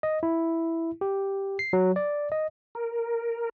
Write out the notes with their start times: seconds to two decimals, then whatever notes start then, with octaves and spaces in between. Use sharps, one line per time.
0.03 D#5
0.23 E4
1.01 G4
1.59 C7
1.73 F#3
1.96 D5
2.32 D#5
2.75 A#4